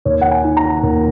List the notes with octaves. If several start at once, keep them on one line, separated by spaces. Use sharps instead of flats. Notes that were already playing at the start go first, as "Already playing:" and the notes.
D#2 C#5
F#5
G#5
D#3
A#5
D#2